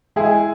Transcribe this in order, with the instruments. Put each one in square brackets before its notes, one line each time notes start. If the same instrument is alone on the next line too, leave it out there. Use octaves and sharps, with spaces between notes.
[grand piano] G#3 [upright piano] E4 G#4